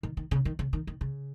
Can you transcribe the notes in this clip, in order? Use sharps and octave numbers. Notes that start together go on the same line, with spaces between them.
D#3
D#3
C#3
D#3
C#3
D#3
D#3
C#3